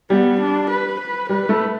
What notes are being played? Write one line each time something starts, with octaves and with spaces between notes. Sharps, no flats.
G3 B3
D4
B4
B4
G3 B4
A3